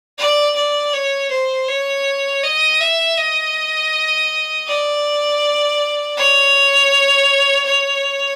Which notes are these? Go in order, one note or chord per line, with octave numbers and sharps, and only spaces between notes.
D5
D5
C#5
C5
C#5
D#5
E5
D#5
D5
C#5
C#5